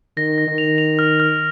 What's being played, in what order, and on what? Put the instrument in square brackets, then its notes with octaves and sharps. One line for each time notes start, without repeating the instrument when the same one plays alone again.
[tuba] D#3 [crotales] A#6
[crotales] A#6
[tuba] D#3
[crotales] F7
F7
F6
F6